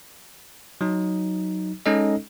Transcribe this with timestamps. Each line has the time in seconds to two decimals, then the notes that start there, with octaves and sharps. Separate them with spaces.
0.81 F#3 D#4
1.86 G#3 C#4 D#4 A4 D#5